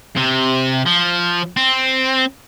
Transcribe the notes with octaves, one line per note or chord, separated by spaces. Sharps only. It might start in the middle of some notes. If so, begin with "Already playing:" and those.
C3
F3
C4